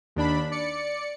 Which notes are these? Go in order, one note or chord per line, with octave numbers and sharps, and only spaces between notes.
D#2 D4 B5
D5 C#7